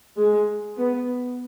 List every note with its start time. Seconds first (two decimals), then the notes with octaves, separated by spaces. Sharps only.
0.17 G#3
0.78 B3